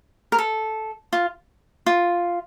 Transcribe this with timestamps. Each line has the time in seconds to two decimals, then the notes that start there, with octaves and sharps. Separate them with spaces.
0.32 A#4
0.39 A4
1.13 F4
1.86 F4